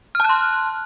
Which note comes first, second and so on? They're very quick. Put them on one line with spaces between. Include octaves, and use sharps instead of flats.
F6 A5 F#6 C6